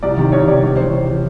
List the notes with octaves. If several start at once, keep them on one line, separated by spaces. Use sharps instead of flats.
C2 D5
C3 D#3
C2 C#5
C3 D#3 D5
C#2 C#5
C3 E3 C5
C#2 C#5
C3 E3